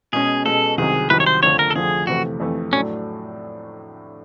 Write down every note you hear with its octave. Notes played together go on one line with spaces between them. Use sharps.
B2 G#3 C#4 G#4
B2 G#3 C#4 A4
C2 C3 D#3 F#3 G#4
C2 C3 D#3 F#3 B4
C#5
C5
F2 D3 F3 A3 C#5
A#4
A4
F2 D3 F3 A3 G#4
F2 C3 E3 A3 F#4
F2 C3 E3 A3
A2 F#3 A3 C#4 D4